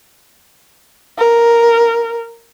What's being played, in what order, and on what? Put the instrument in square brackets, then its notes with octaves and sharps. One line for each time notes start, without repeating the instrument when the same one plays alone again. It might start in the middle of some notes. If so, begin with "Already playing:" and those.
[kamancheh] A#4